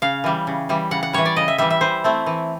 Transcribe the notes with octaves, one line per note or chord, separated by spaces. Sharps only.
C#3 F5
E3 G3
C#3
E3 G3
C#3 F#5
F#5
E3 G3 C#5
D5
C#3 D#5
E5
E3 G3 E5
E5
E3 C5
A3 C4 E4
E3